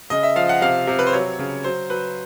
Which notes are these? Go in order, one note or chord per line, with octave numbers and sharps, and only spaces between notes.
C#3 D#5
E5
F3 F5
F#5
C3 F5
C3
B4
C5
F#3 C#5
C#3
F#3 C5
F#3 B4